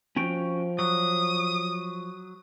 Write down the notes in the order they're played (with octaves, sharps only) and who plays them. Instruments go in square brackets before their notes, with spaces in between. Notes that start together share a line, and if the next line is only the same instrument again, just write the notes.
[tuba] F3 [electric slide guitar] C#4 F#4 G5
[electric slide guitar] F#3 [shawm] D#6